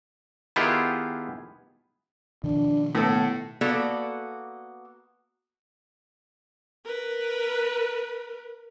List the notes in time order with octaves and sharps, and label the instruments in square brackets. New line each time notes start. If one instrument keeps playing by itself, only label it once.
[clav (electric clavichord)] D#3 B3 E4 F4 G4 G#4
[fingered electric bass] B2 D#3 F3 [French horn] D4
[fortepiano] A2 A4 [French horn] B3
[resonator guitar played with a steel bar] A#3 B3 F#4 A4 D5
[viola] A#4 B4